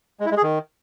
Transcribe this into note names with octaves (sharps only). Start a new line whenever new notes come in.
G#3
E4
G#3
G#4
D#3